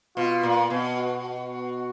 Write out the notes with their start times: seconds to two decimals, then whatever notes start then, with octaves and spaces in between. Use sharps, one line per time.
0.16 B2 F4
0.43 A#2
0.70 B2
0.97 F#4
1.38 F#4